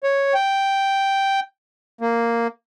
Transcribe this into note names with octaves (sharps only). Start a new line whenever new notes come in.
C#5
G5
A#3